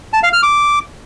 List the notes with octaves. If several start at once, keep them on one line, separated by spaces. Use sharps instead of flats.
A5
F5
F6
D6